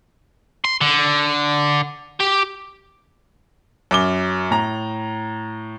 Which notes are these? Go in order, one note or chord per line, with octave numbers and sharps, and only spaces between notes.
C6
D3
G4
F#2 D6 G7
A2 A#5